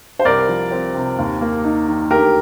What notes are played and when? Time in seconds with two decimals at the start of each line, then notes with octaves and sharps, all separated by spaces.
0.19 C5
0.25 C2 A#4 D5
0.48 F3
0.71 C4
0.95 C3
1.18 D#2
1.41 A#3
1.64 D#4
1.88 D#3
2.11 D2 G4 A#4